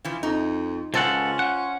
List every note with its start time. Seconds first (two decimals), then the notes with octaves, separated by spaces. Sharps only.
0.05 E3 F3
0.23 F2 D#4
0.94 C#2 C#4 F4 A4 C5 F#5
1.39 F#5